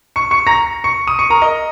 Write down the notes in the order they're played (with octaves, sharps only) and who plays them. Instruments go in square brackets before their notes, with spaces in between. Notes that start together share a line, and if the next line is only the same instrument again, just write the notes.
[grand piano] C#6 C#7
C#6 C#7
A#5 A#6
C#6 C#7
D#6 D#7
C#6 C#7
A#4 A#5
D#5 D#6